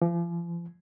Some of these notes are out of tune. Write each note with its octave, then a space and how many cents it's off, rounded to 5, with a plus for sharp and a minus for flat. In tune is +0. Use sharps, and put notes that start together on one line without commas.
F3 -40